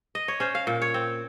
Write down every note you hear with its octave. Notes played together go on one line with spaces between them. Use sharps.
D#5
C#5
C#4 C5
F5
A#2
C#5
C4